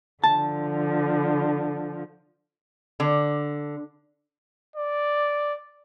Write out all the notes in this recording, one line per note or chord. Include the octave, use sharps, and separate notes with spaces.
D3 F3 A5
D3
D5